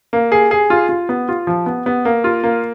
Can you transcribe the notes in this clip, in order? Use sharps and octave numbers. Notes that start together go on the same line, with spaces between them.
A#3
G#4
G#4
F4
F4
B3
F4
F3
B3
B3
A#3
F4
A#3